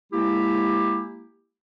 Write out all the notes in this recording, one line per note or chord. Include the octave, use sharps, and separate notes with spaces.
G#3 A#3 E4 G4